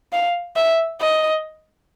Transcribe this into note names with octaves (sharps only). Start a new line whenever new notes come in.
F5
E5
D#5